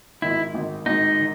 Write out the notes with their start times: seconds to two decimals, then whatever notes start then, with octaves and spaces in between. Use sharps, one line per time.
0.22 G#1 G#2 D#3 E4
0.54 G#1 G#2 D#3
0.86 G#1 G#2 D#3 D#4
1.19 D#3